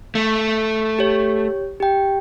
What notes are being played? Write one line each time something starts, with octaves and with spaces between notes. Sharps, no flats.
A3
G4 C#5
G4 G5